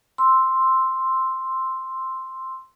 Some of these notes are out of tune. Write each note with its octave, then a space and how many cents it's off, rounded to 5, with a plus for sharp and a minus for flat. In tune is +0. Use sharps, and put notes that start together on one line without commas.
C6 +0 E6 +0